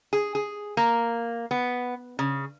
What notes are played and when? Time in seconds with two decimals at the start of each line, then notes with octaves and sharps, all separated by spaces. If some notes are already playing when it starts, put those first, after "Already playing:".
0.13 G#4
0.35 G#4
0.77 A#3
1.51 B3
2.19 C#3